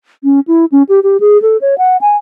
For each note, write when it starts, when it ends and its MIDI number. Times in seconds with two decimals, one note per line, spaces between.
0.24 0.40 61
0.47 0.65 64
0.72 0.83 61
0.89 1.00 67
1.03 1.17 67
1.20 1.40 68
1.42 1.57 69
1.61 1.75 73
1.78 1.97 78
2.01 2.16 80